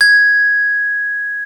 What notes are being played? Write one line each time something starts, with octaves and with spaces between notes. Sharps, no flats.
G#6